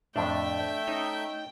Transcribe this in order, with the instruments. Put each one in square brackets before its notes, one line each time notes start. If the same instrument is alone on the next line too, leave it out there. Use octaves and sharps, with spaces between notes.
[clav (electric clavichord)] F2 A2 [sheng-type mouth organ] A3 E5 [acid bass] D4 [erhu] G5
[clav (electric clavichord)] C#4 [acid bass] D#4